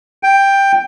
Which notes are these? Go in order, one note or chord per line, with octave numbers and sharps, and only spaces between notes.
G5